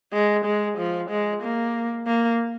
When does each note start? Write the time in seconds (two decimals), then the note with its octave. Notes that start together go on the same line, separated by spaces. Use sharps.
0.13 G#3
0.45 G#3
0.78 F3
1.10 G#3
1.42 A#3
2.07 A#3